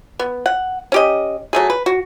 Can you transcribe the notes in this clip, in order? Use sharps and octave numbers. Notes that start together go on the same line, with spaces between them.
B3
F#5
C#4 G4 D#5
F#3 A3 G#4
B4
F#4